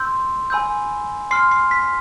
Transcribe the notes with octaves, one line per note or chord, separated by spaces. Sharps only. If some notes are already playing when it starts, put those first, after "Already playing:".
Already playing: C6 E6 G6
G#5 B5 E6 G6
C6 F6 C7
C7
B6